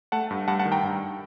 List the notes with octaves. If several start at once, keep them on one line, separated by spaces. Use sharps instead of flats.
A3 F#5 A5
G2
G2 F#5 A5
F#5 A5
D#3
G5 A#5
G2